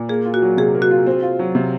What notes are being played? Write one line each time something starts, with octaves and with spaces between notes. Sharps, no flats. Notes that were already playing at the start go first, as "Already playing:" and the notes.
Already playing: A#2
A#3 G#4
F4
F#4
F#3
C3 G#4
A#3
F#4
F4
C4
F4
F#3
C3